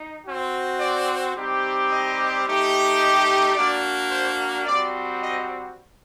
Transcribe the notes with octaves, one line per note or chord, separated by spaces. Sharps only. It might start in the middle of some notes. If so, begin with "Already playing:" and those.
Already playing: D#4
C4 F#4
D5
G3 C4 D#4 G4
D#5
A3 D#4 G4
D#5
A#3 D4 F#4 D5
C5
G3 C4 F#4 D5
D#5